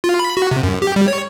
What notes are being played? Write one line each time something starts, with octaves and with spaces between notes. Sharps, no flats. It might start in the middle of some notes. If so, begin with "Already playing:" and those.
F4
B5
F#4
C3
F#2
G4
G3
C#5